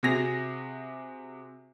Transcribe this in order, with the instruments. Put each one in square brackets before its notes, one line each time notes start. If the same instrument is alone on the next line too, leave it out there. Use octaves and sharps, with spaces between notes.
[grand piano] C3 F#4 G#4 A#6 F7